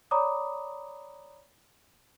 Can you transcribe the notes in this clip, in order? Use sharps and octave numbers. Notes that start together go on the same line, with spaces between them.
C#5 D5 A#5 B5 D6 D#6